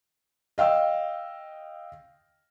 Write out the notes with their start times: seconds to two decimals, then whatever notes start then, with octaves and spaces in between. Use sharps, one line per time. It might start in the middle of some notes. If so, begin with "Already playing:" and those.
0.58 D#5 F5 G5 E6